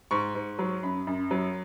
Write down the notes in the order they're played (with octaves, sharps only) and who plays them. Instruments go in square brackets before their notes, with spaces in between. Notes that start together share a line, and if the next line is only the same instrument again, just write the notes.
[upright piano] G#2 C#6
G#2
F#3
F#2 B5
F#2
F#3